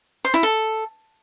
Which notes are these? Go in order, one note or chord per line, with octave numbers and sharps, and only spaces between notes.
C5
E4
A4